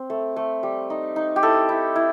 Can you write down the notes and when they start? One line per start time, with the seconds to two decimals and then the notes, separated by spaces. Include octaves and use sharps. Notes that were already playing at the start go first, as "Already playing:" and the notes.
Already playing: C4
0.10 A3
0.36 A3
0.63 G3
0.90 D#4
1.16 D#4
1.36 G4
1.42 E4 A4
1.69 E4
1.96 E4